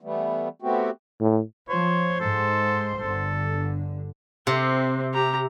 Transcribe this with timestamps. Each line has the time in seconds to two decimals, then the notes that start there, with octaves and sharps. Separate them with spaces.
0.01 E3 G3 A3 B3
0.62 A3 B3 C4 F#4 G4
1.20 A2
1.69 F3 C5 C#5 C6
2.20 G#2 A4
3.00 G1 D3 A4
4.47 C3 C4
5.14 G4 A#5